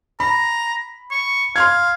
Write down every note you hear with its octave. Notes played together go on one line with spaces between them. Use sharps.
A#5 B5
C#6
F5 C6 F6 G#6